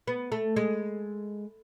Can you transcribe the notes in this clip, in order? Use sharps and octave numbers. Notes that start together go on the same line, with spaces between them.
B3
A3
G#3